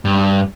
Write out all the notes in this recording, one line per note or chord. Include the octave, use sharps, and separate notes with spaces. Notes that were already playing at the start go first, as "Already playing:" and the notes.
G2